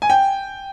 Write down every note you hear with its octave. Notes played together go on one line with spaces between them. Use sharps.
G#5
G5